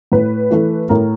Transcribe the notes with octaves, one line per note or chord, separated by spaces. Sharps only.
A2 B4
E3 A3
A2 A#4